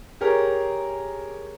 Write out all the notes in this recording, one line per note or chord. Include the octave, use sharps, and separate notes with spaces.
G4 G#4 A#4 C#5